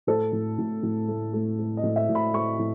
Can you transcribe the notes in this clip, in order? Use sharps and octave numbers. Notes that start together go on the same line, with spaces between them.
A2 A4
A2
A2
A2
A3
A3
A3
D#5
A2
E5
A2
B5
A3 C#6
A2